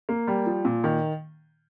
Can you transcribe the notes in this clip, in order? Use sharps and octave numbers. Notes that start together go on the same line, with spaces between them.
A#3
G3
F3
A#2
D#3